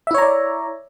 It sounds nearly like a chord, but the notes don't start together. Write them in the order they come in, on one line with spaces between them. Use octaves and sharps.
E5 E4 C#5 A#5 D5